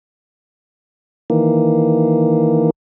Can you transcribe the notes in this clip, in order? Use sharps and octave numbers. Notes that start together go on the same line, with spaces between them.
D#3 E3 A#3